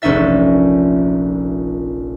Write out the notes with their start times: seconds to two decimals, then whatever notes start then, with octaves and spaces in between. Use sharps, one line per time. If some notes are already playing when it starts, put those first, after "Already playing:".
0.02 F1 A#1 C#4 D#4 E5 A6